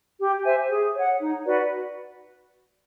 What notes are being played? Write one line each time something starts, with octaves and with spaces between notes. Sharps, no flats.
G4
C5 E5 G#5
G#4
C#5 F#5
D#4
F#4 B4 D5